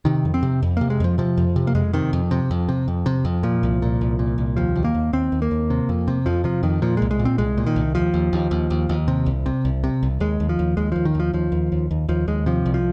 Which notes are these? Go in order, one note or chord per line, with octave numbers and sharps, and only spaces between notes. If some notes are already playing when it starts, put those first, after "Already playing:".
C3 D#3
F2
C4
C3
F2
C3 A#3
G#3
F2 F3
C3 F3
F2
C3
A#3
F2 G#3
C3 D#3
F2
C3
F2
C3
F2
C3
F2
A#2 F3
C2
A#2
C2
A#2
C2
D#2 F3
D#2
A#3
D#2
D#2 C4
D#2
A#3
D#2
C3
F2
C3
F2 F3
C3 F3
F2 D#3
A#2 F3
G#3
C2
G#3
A#2
C4
C2 G#3
A#2
D#3
C2
D#2 F3
D#2
D#2
D#2
D#2
D#2
C3
C2
C3
C2
C3
C2
D#2 G#3
D#2
F3
D#2
D#2 G#3
D#2 F3
D#3
D#2 F3
D#2 F3
D#2
D#2
D#2
D#2 F3
D#2 G#3
C3 F3
C2
F3